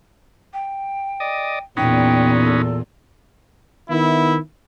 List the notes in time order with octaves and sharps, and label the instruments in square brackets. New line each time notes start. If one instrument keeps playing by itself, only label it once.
[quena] G5
[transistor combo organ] D5 D#5
[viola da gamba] E2 A#2 [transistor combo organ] B3 C#4 D#4 [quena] G5
[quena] A4
[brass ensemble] D#3 B3 E4